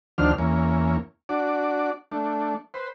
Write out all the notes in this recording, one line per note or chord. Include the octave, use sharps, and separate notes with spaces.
D2 D#3 F3 D4 C5 F6
E2 A#3 C#4
D4 F#4 D5
A3 D4
B4 C5